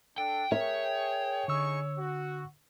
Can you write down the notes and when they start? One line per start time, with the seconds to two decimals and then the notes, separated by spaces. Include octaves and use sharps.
0.18 D4 A4 G5
0.52 G#4 A#4 C#5 E5 G5
1.48 D3 D#4 G#4 C#6 E6
1.97 F#4